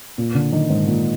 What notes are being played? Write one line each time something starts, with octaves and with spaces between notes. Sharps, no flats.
A#2
D3
D#3
G#2
A#2